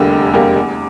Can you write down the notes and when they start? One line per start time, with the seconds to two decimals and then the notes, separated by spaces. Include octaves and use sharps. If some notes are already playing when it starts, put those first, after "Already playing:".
Already playing: F1 E2 D3 G3 A#3
0.12 F1
0.34 E2 D3 G3 A#3
0.56 E2